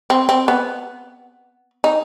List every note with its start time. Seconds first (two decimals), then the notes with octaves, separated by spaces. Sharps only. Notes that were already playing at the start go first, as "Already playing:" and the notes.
0.10 C4
0.29 C4
0.48 B3
1.84 D#4